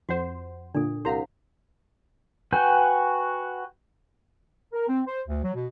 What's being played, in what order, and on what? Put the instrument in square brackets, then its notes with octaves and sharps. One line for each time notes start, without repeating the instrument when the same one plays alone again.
[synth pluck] F2 C5 [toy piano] F#4 F#5
[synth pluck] A#2 D3 [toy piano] D4 A4
[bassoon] C2 [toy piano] E4 F5 F#5 [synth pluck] C5 A#5
[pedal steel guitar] F#4 B4 G5 G#5 G6
[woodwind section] A#4
C4
C5
D2
F#3
B2